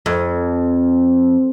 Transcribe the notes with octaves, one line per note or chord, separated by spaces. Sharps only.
F2